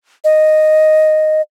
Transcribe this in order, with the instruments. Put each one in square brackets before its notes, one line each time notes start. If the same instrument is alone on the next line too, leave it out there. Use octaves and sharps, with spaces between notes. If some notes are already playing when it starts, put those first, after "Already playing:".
[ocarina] D#5